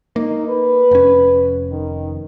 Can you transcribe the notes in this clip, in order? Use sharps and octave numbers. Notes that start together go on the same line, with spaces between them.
A#3 D#4
B4
F1 C#4
D#3